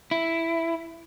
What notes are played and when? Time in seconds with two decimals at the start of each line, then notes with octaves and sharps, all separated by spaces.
0.11 E4